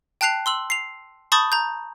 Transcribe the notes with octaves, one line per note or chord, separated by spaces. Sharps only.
G5 A5 F#6 C7 F7
C6 E6 F#7
C7 F7
A5 B5 C#6 D#6 G6 A6
A#5 G6